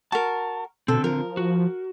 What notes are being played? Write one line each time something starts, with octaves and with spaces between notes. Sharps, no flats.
F#4 A#4 A5
B2 D3 C4 A4
F3 A#4
F#4